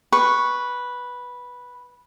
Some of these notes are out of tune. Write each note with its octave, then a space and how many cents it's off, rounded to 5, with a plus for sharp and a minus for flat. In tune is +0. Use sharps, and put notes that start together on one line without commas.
B4 -5 C#6 +0